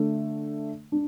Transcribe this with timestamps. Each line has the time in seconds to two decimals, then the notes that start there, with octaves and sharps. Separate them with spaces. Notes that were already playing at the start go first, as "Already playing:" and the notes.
Already playing: D3 A3 D4
0.92 D4